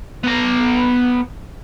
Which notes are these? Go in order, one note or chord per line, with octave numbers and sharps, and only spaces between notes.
B3 A#5